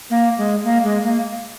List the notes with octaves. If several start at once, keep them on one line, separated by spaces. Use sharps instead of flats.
A#3
G#3
A#3
G#3
A#3